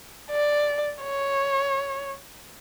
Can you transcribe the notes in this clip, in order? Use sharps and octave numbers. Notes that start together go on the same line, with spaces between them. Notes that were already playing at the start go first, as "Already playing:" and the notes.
D5
C#5